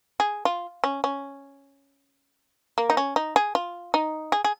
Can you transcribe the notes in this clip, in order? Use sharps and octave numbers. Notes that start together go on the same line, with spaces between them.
G#4
F4
C#4
C#4
A#3
D#4
C#4
D#4
G#4
F4
D#4
G#4
G#4